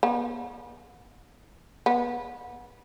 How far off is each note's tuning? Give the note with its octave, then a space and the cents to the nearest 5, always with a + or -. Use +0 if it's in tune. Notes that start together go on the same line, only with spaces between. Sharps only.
B3 -40
B3 -30